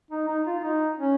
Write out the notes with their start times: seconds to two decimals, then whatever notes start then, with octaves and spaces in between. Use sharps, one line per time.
0.11 D#4
0.28 D#4
0.46 F4
0.59 F4
0.63 D#4
0.99 C#4